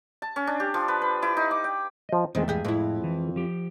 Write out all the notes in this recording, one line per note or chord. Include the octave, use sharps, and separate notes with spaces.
A5
C#4
D4
G4
F3
B4
B4
E4
D#4
D6
G5
F3 D#5
E2 D#3 G#3 A3 C4
G2 G#3 G4 G#4
F2 A2 E4
E3
F3 G4